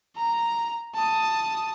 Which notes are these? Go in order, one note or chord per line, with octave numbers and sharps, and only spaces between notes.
A#5
A5 D#6